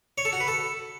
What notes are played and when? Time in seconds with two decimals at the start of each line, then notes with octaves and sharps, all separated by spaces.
0.18 C#5
0.25 A4
0.33 F#4
0.40 B4
0.48 A4